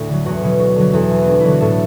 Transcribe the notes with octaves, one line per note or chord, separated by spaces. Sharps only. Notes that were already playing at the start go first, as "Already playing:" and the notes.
Already playing: D2 A2 A4
D3 F#3
E2 F#4
B2 F#3
D2
D3 F#3
E2 A4
E3
B3
D2 D4
D3 F#3 E4
F#4
A2 A4